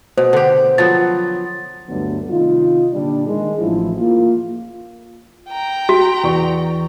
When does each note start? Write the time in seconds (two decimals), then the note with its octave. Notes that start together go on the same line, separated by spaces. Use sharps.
0.18 B2 C5
0.33 D3 G4
0.78 F3 F#3 B3 A6
1.89 D2 G2 D3 F#3 A3 B3
2.30 C3 D#3 D#4 F4
2.93 A#2 D3 G3 D4
3.27 D#3 G#3
3.60 A1 F3 E4
3.98 A#3 F4
5.49 G5 A#5
5.89 F#4
6.24 E2 D5 C#6